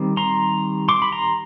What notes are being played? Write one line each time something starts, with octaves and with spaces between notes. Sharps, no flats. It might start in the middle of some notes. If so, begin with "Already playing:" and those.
Already playing: D#3 G3 C4
A#5 C6
C6 D6
B5
A#5 C6